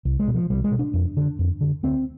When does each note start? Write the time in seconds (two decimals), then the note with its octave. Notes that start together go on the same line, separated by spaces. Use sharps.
0.05 C2
0.19 G#3
0.28 B2
0.35 F3
0.50 C2 G3
0.64 G#3
0.71 B2
0.79 D4
0.94 F2
1.17 D3
1.39 F2
1.61 D3
1.83 D2 C4